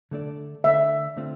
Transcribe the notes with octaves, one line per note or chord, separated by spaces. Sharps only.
D3 A3 D4 A4 D5
D3 A3 D4 A4 D5 E5
D3 A3 C4 F4